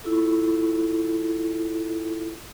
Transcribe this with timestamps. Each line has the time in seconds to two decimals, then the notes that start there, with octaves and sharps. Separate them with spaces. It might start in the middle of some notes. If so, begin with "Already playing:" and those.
0.04 E4 F4 A4